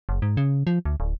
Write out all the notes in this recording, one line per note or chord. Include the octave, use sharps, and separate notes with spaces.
F#1
G#2
C#3
F3
D2
D1